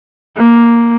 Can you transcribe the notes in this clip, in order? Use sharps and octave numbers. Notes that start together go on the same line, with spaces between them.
A#3